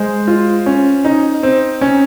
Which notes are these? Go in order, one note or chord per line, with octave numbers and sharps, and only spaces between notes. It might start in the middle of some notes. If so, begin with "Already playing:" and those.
Already playing: G#3 C5
F4
C#4
D#4
C4
C#4